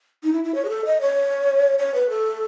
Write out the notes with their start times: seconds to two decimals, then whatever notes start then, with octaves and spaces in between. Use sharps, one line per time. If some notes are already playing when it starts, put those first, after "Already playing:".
0.23 D#4
0.33 E4
0.44 E4
0.55 C#5
0.65 G#4
0.70 A4
0.85 D#5
1.01 C#5
1.79 C#5
1.94 B4
2.10 A4